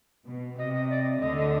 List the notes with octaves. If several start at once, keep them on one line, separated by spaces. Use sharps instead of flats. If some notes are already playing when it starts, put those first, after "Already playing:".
B2
C3 D#5
D#5
D5
D#5
D2 D3 D#5
D#5